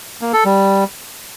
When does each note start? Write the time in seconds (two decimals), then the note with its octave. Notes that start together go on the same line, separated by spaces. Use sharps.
0.21 A#3
0.33 A4
0.45 G3